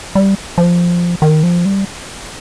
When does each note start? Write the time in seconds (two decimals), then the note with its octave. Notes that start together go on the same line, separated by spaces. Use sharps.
0.15 G3
0.58 F3
1.22 D#3
1.43 F3
1.65 G3